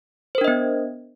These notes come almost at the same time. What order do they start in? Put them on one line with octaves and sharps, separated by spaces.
C5 A#4 D4 D#5 B3